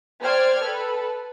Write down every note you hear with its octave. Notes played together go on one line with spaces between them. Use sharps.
C5 D5 G5 F6 G#6
A4 B4